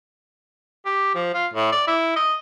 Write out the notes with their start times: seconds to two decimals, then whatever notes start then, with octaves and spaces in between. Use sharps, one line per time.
0.86 G4
1.15 F3
1.34 F4
1.53 A2
1.72 D5
1.87 E4
2.16 D#5